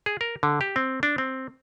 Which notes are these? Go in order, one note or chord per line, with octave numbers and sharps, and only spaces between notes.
G#4
A#4
D3
G4
C4
D4
C4